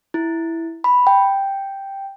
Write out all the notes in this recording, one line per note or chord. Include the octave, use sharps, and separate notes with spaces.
E4
B5
G5